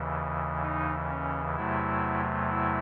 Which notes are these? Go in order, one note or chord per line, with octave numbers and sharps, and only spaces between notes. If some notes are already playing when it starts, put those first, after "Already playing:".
Already playing: D#2 C#3 E3
D#4
C#4
E2 C3 F#3 A3 E4
E4